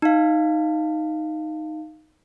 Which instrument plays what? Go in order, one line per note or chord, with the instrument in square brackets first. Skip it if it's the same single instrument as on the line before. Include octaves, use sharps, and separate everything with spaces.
[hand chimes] D#4 F5